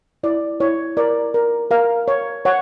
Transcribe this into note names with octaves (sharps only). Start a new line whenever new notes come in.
E4 D5
E4 C#5
A#4 D5
A#4
A#4 F5
C#5
C#5 F#5